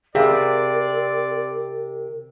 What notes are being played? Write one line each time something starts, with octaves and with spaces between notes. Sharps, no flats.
C3 C4 G#4 A#4 D5 F5 B5